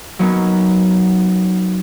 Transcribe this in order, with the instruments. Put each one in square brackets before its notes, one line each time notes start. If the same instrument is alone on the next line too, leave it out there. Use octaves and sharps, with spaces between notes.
[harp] F#3 A#3 B3 C#4 D#4